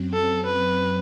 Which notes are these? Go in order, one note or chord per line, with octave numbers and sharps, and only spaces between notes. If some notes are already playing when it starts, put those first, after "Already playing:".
Already playing: F#2 F#3 C4
A4
B4